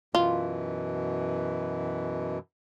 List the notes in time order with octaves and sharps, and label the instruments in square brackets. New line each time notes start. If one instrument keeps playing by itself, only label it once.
[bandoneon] F#2 B2 E3 [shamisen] F4